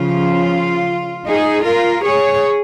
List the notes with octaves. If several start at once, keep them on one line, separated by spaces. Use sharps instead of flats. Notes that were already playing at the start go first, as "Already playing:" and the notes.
Already playing: C#3 F3 C#4 F4
D#4 G#4
F4 A#4
G#4 C#5